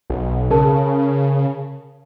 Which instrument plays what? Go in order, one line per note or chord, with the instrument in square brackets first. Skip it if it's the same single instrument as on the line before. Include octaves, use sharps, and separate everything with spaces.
[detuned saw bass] B1
[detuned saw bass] C#3 [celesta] G#4 A#4 A5